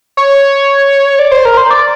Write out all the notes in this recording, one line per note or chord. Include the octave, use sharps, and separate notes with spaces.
C#5
D5
C5
A#4
C5
D5